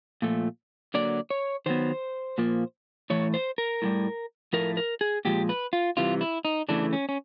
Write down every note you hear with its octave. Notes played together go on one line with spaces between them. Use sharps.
A#2 F3 A3
D3 F#3 A#3 D5
C#5
D#3 F#3 B3 C5
A#2 F3 A#3
A2 E3 A3 C#5
C5
A#4
A2 E3 G3
A2 F3 A3 A#4
A#4
G#4
A#2 F3 G#3 G4
B4
F4
C3 E3 G3 F4
E4
D#4
C#3 E3 A3 D4
C#4
C#4